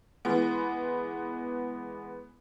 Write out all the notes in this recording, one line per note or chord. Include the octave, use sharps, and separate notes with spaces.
E3 G#3 B3